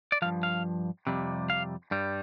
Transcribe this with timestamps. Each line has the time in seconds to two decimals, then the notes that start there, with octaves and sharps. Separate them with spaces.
0.12 D5
0.22 G2 F3 F5
0.43 F5
1.07 F2 C3 G3
1.50 F5
1.91 G2 G3